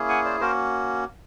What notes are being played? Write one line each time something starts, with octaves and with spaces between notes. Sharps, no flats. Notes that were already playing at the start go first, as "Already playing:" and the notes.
Already playing: A#3 C#4 E4 G#4
F#5 G#5
C5 D5
A#3 C#4 F#4 A#4 C5